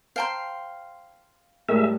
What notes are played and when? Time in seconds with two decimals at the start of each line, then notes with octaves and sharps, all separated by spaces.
0.16 C5 F5 G5 A5 A#5 C6
1.69 A2 G3 G#3 A4 A#4 E5